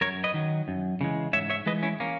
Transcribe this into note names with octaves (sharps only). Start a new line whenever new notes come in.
F#2 A#4 C#5
B4 D#5
D#3 F#3
F#2
C#3 E3 G#3
G#2 C#5 E5
C#5 E5
E3 G#3 B4 D#5
C#4 E4
A#3 C#4